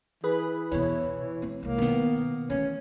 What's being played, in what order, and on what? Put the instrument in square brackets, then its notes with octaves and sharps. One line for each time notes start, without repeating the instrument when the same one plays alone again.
[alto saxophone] E3 [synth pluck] G#4 B4 B5
[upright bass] E2 B2 [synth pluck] E4 C#5
[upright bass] A3 C4
[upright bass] C2 G#3 [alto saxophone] A#3
[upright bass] B2 [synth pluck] D#3 B3
[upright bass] E3 A3 [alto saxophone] C#4